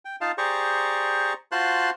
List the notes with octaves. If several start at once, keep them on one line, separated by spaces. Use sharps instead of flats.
G5
D#4 F4 F5 A5
G4 G#4 C5 D5 A#5 C#6
F4 F#4 C5 A5 C6 F#6